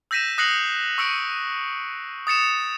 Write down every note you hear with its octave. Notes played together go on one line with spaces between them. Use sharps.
E6 G6 A#6 B6 D#7 E7
D#6 F#6 A#6 C7 C#7 F#7
C#6 E6 C#7 D7
D#6 A6 C#7 E7